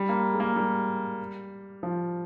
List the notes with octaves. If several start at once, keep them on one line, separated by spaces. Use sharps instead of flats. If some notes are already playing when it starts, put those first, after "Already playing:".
Already playing: G3
A#3
G#3
A#3
G3
F3